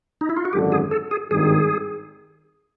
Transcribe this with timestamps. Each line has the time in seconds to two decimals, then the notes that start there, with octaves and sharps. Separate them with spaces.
0.21 D#4
0.30 E4
0.37 F4
0.45 F#4
0.53 G#1 F#2 D3 G4
0.72 G#4
0.91 A4
1.11 G#4
1.31 G#1 G2 D#3 G#4